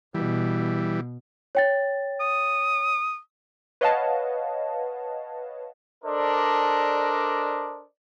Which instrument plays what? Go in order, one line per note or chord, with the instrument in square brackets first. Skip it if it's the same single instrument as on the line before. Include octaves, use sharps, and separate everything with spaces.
[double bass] B2 [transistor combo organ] E3 G3
[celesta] C#5 G5 A6
[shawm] D#6
[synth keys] B4 C#5 D#5 F5 F#5 A5
[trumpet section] D4 A4 A#4 C5 D5 D#5